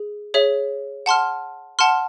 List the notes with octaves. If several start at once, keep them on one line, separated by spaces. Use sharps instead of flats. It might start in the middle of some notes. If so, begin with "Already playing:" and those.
Already playing: G#4
G#4 C#5 E5
F#5 A5 C6 F6
F#5 A5 C6 F6